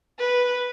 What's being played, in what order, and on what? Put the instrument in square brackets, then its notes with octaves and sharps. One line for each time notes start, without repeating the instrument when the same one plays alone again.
[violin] B4